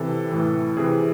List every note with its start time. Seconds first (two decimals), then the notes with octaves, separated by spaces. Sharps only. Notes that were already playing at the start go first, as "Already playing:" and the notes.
Already playing: C3 E3 A4
0.32 A2 E3
0.77 C3 E3 G#4